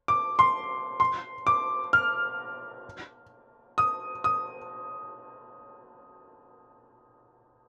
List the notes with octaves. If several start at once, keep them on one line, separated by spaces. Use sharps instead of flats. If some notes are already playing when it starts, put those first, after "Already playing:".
D6
C6
C6
D6
F6
D#6
D#6